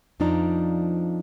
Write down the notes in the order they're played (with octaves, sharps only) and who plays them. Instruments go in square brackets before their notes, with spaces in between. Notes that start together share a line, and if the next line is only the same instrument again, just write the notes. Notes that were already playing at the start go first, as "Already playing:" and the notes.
[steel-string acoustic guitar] F2 F3 D4 D#4 D5 A#5